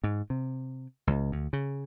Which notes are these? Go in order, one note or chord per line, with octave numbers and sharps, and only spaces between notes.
G#2
C3
C#2
D2
C#3